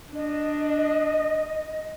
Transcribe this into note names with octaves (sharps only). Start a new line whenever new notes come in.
D4 D#5